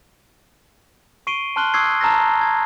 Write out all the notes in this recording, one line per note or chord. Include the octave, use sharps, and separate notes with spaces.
C#6 C7 D7 D#7 G7
A5 C6 F6 F#6 F#7 G7
C#6 D#6 E6 F#6 G#6 C7
A5 A#5 E6 F6 A6 A#6
G#6